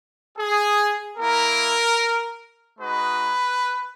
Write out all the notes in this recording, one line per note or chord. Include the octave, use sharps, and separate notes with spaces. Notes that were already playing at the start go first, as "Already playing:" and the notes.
G#4
A#3 E4 A#4
G#3 D#4 F#4 B4